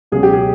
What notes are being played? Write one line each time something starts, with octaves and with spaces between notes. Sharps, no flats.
C#2 B2 F#3 G#4
G4
G#4